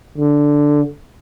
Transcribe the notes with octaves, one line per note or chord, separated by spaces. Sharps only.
D3